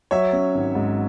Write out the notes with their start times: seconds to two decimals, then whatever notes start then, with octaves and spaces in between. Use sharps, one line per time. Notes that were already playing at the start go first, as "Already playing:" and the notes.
0.11 F#3 C#5 E5
0.33 C#4
0.54 G#1
0.75 G#2